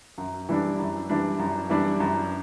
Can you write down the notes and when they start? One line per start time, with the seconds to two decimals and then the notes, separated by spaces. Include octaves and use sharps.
0.18 F#2
0.49 E3 G3 D4
0.79 F#2
1.09 E3 G3 D4
1.39 F#2
1.69 E3 G3 D4
2.00 F#2